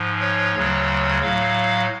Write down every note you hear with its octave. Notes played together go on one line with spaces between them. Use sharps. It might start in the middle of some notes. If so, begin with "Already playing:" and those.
Already playing: G#2 F3
C#5
D2 C#3 F#3
A2 F#3 F5